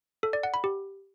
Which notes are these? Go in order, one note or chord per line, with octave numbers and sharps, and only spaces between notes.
A4
D5
F#5
B5
G4